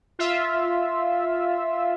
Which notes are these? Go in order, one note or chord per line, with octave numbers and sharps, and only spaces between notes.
F4 E5